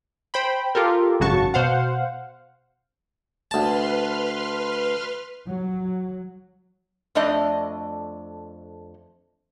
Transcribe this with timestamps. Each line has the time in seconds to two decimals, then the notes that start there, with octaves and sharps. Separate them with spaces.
0.34 C5 G5 B5
0.75 F4 G4 A4 A#4
1.20 G#1 F#2 C#3 F#4 A5 C#6
1.54 B2 C5 F5 F#5
3.51 D2 B4 A5 C6 F6
5.48 F#3
7.15 F2 A3 D4 D5 D#5